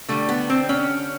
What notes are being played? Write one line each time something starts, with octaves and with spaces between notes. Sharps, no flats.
D3 G3 A3
B3
C4
C#4